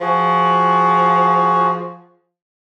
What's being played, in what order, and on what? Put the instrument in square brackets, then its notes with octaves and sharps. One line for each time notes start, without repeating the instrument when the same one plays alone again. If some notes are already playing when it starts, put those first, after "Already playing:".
[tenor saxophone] F3 [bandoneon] F#4 G#4